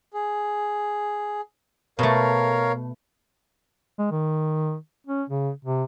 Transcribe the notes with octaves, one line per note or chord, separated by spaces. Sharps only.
G#4
B2 A3 A#4 C#5 F5
G#3
D#3
C#4
C#3
C3